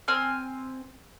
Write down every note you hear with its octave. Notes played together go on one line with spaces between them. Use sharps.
C4 G#5 F6